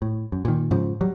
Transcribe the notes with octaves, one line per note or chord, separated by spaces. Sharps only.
A2
F#2
A#2 D#3
G#2 C#3 F3
F#3 G3